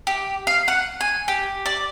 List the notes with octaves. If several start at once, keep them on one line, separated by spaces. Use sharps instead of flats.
G4
F5
F#5
G#5
G4
D5